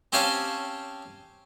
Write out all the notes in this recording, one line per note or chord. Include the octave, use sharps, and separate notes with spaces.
C4 C#4 G4 C#5 F5 A5